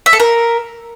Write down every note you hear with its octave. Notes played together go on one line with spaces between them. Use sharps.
E5
A4
A#4